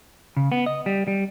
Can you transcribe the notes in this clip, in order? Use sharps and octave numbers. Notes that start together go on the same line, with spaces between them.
C#3
B3
D#5
G3
G3